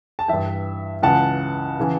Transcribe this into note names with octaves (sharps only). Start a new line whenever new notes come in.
A5
G2 E3 E5 G5
C#2 C#3 E3 F#5 A5
C#3 E3